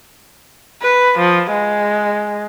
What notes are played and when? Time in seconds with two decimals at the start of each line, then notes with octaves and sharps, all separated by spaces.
0.82 B4
1.19 F3
1.52 G#3